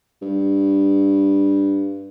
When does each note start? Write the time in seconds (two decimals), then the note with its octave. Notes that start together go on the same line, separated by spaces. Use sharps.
0.22 G2